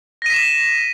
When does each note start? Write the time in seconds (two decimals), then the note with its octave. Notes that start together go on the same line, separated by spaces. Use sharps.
0.22 A#6
0.26 D#7
0.30 B6
0.34 E7